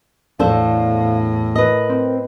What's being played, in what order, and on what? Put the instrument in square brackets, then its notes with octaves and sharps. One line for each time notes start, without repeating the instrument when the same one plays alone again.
[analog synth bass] E2 [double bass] A2 [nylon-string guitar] D4 A4 C5 [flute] F5
[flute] A#4 [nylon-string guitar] B4 D#5
[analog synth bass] C4